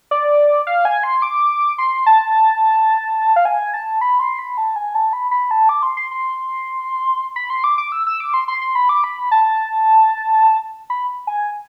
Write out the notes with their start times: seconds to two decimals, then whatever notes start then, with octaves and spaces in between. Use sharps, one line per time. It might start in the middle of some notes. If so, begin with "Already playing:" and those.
0.11 D5
0.67 F5
0.85 G#5
1.03 C6
1.22 D6
1.78 C6
2.06 A5
3.36 F5
3.45 G#5
3.74 A5
4.01 B5
4.20 C6
4.39 B5
4.58 A5
4.76 G#5
4.95 A5
5.13 B5
5.31 B5
5.51 A5
5.69 D6
5.83 C6
5.97 C6
6.11 C6
7.36 B5
7.50 C6
7.64 D6
7.78 D6
7.92 E6
8.07 E6
8.20 D6
8.34 C6
8.48 C6
8.61 C6
8.75 B5
8.89 D6
9.04 B5
9.31 A5
10.90 B5
11.27 G#5